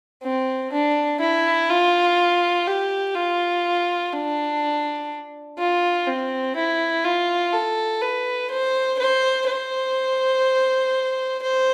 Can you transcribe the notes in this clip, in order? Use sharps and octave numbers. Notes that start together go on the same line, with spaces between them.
C4
D4
E4
F4
G4
F4
D4
F4
C4
E4
F4
A4
B4
C5
C5
C5
C5